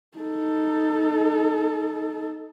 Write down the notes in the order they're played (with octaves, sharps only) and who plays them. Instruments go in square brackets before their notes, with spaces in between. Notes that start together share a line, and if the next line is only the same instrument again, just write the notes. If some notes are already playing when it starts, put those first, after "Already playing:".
[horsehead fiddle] D#4 A4